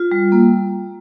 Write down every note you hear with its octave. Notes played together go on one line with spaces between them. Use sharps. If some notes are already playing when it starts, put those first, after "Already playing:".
Already playing: F4
G3
A#3